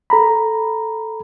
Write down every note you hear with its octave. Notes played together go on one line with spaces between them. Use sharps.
A4 A#5 B5